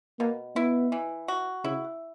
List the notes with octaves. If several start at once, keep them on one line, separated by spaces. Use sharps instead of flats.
B2 A#3
B3 E4
E3
F#4
C#3 E4